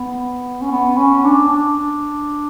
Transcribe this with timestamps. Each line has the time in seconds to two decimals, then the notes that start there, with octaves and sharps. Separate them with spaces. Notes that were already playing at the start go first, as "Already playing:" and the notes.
Already playing: B3
0.62 C#4
0.71 B3
0.97 C#4
1.24 D4
1.50 D4